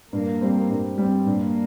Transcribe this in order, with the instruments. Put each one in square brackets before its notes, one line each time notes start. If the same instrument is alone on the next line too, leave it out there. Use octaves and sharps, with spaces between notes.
[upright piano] G2 [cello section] A#3
[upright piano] G3 C4
G2
G3 C4
[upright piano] G2 [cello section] A#3